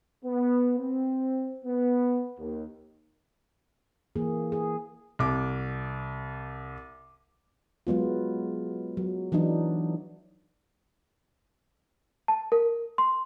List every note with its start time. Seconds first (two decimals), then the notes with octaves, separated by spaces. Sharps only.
0.25 B3
0.78 C4
1.65 B3
2.39 D#2
4.15 E3 A#3 G#4
4.52 G#4
5.19 C2 D6
7.87 F#3 G#3 B3 F4
8.97 F#3
9.32 E3 F#3 D4 D#4
12.28 A5
12.52 A#4
12.98 C6